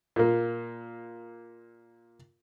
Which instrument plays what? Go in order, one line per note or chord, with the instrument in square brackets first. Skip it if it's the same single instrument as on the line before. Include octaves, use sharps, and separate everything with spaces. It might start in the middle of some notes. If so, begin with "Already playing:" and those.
[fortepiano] A#2 A#3